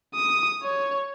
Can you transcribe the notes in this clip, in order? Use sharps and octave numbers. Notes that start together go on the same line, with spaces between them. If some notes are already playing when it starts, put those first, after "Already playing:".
D#6
C#5